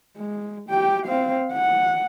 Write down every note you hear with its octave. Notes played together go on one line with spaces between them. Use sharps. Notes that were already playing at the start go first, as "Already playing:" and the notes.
G#3
G4 G5
C4 F5
F#5